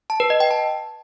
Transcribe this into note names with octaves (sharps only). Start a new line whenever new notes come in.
A5
B4
D#5
G5
A5